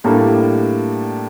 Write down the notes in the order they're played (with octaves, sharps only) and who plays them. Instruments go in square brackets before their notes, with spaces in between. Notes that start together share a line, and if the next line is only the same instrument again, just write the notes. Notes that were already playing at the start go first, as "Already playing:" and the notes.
[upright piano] A2 G3 A#3 D4 A4